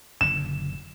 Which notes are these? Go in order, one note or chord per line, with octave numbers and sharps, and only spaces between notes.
F#1 A#2 D3 E7